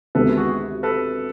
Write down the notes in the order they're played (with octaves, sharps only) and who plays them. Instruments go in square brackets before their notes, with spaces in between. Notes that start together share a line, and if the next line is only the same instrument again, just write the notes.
[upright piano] D2 C3 D#3 G#3 B3 [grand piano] A4 B4
[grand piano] F#4 G#4
A4 B4